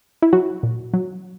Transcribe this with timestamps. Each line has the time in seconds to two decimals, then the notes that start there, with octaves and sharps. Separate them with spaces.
0.22 E4
0.33 F#3 F#4
0.63 A#2
0.94 F#3